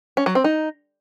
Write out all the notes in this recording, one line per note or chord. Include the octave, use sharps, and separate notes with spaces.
C#4
F#3
C4
D#4